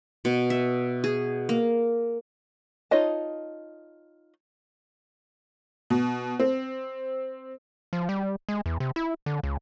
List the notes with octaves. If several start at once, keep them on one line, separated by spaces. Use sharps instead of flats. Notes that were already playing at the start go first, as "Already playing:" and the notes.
B2
E5
G#4
A#3
D#4 F4 C#5 D#5 A5
B2
C4
F3
G3
G#3
E2
C3
E4
D3
C#2